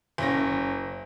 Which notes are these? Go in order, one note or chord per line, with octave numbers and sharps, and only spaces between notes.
F#1 C#4 A#6